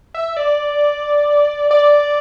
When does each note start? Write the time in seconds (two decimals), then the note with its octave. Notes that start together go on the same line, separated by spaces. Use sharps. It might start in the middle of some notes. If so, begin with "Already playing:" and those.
0.14 E5
0.37 D5
1.71 D5